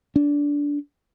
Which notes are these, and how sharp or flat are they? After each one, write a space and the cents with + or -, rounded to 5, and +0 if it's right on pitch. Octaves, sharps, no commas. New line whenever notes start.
D4 -20